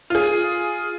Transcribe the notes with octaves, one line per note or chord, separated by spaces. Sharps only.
F4 G#4